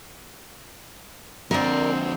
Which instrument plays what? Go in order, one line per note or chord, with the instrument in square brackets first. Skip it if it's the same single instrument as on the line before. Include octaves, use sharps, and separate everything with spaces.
[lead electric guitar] F2 D3 [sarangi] C4 [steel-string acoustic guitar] A#4 D5